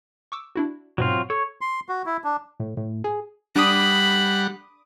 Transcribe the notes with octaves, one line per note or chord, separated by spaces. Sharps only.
C#6 D6 E6
D4 E4 F#4
G#2 B2 F#3 C4 F4
A4 C#5
C6
F#4
E4
D4
A2
A2
G#4
G3 D4 F#5 B5 D6 D#6